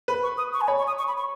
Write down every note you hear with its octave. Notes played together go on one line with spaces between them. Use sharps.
B4 B5
C#6
D#6
C#6
G#5
C#5 B5
C#6
D#6
C#6
B5
C#6